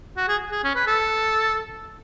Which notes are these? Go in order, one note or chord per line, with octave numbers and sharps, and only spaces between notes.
F#4
G#4
G#4
C#4
B4
A4